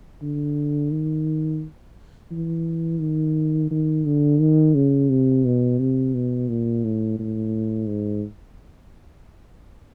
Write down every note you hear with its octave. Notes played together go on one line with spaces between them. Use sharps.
D3
D#3
E3
D#3
D#3
D3
D#3
C#3
C3
B2
C3
B2
A#2
A2
A2
G#2